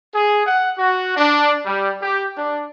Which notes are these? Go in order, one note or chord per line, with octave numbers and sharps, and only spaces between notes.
G#4
F#5
F#4
D4
G3
G4
D4